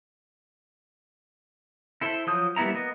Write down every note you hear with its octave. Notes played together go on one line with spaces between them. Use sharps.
E4 A4 C5
F3 F#3 D#6 G6
G3 A#3 B3 E4 A#5
A#3 B3 D#5